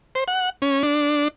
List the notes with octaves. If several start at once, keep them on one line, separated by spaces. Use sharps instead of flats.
C5
F#5
C#4
D4